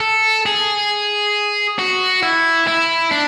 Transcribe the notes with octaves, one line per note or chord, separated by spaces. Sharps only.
A4
G#4
F#4
E4
E4
D4